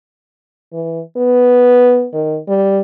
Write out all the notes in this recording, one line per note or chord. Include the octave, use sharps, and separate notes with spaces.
E3
B3
D#3
G3